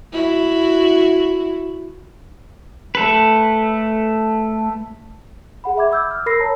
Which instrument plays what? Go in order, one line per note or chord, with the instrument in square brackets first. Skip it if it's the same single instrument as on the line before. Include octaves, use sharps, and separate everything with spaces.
[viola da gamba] E4 F#4
[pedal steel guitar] A3 A4 B4
[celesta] G#4 F#5 B5
E5 B5 D6 G#6
D6 E6 G6
F6
A#4 B5 E6 A#6 C7
C#5 A5 A#5